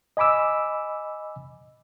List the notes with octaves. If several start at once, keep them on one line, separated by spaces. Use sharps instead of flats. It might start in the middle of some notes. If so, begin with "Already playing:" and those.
D#5 G#5 B5 D6 E6